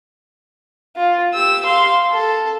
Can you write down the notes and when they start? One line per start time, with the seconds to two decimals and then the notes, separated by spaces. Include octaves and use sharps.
0.96 F4
1.33 G4 E6
1.65 F5 C6
2.11 A4